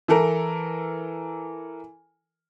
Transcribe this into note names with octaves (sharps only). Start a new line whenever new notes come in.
E3 A4 A#4